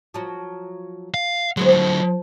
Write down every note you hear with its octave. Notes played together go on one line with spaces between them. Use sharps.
F3 F#3
F5
D3 F#3 G#3 B3 C5
F3